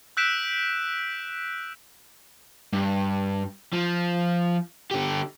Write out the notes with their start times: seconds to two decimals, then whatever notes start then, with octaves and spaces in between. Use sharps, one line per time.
0.17 E6 F#6 G6 B6 D7 E7
2.73 G2
3.73 F3
4.91 D3 G4